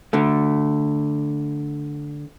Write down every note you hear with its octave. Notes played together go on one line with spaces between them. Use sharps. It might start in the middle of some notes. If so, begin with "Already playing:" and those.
D3 A3